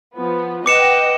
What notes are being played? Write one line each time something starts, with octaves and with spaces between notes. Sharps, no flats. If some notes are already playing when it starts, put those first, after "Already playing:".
F3 B3
B4 D#5 F#5 G5 D6 C#7 E7